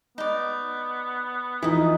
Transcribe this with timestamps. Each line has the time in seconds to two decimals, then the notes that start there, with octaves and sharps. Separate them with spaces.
0.18 B3 D#4 D5
1.62 E3 F3 D#4 E4 D#5